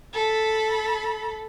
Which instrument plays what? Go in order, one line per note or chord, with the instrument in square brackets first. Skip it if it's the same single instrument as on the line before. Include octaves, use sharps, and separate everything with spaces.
[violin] A4 B5